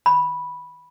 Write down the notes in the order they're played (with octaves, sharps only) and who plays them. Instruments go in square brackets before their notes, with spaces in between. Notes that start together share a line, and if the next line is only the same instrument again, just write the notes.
[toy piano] B5